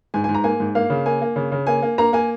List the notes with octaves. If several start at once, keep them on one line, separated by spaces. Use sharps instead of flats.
G#2 G#5
G#5
G#2
A#5
A#3 G#5
G#2
A#3 F5
C#3
A#3 G#5
A#3
C#3
C#3
A#3 G#5
A#3
A#3 A#5
A#3 G#5